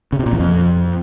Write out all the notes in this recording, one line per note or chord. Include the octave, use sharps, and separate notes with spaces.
C#3
C3
A#2
E2
F2